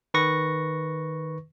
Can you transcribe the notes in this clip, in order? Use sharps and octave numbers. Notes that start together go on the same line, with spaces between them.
D#3 B4 C#6 A#6